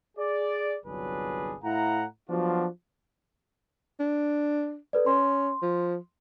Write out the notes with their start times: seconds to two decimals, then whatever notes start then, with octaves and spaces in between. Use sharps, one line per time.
0.17 G#4 D5
0.85 G1 C2 F#3 D4 G#4 B4
1.64 A2 E4 F5 F#5 A#5
2.29 F3 F#3 B3 D4 F4 F#4
4.00 D4
4.93 A4 B4 D5
5.06 C#4 C6
5.62 F3